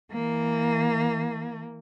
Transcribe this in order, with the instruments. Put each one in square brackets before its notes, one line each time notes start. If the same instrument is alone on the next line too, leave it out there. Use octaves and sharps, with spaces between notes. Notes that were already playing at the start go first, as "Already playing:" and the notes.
[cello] E3 A#3